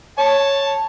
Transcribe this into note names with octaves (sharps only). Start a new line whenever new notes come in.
C#5 A5